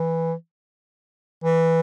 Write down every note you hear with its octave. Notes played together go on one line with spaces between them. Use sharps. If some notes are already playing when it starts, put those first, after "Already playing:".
Already playing: E3
E3